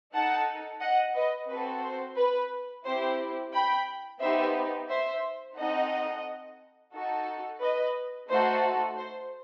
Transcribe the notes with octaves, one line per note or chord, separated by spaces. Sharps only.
D#4 A4 F#5 A5
D#5 F#5
B4 D#5
C4 F#4 A4 B4
C5
B4
C4 E4 G4 C5
G5 B5
B3 D#4 G4 C5 E5
C5 E5
C4 D#4 A4 D#5 F#5
D#4 F#4 A4
B4 D#5
A3 D#4 F#4 A4 C5
C5